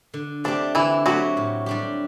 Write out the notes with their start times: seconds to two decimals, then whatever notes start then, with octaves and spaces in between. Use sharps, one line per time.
0.14 D3
0.44 A3 C4 D4 G4
0.75 D3 E3 E4
1.06 F#3 A3 C4 F#4 G4
1.37 A2
1.66 G3 D4 G4